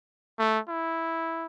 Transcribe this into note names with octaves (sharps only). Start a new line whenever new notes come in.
A3
E4